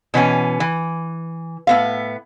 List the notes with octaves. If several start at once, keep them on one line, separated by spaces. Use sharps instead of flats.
B2 E3 B3 C#4
E3
A2 B3 F5